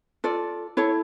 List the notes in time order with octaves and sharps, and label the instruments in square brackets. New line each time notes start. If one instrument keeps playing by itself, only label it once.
[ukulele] F4 A4 D5
E4 A4 C#5